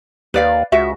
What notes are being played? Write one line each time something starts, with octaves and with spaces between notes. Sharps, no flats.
D#2 B4 D5 F5
C#2 F#4 E5